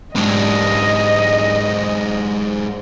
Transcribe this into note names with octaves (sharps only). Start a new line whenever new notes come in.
G#2 D4 D#5